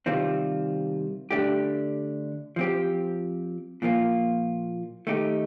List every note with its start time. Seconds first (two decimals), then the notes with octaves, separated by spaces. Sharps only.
0.06 C3 D#3 G3 C4 F4
1.31 D3 A3 D4 G4
2.56 F3 C4 G4
3.82 A#2 F3 A#3 F4
5.07 D#3 A3 D#4 G4